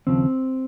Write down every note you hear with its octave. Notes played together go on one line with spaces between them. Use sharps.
D#2 C#3 F3 C4